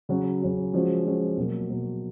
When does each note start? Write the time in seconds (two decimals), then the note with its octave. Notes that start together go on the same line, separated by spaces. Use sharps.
0.09 C#3 F#3 C#4 F#4
0.41 C#3 F#3 C#4 F#4
0.74 F3 G#3 C#4 F#4
1.05 F3 G#3 C#4 F#4
1.37 B2 F#3 A#3
1.69 B2 F#3 A#3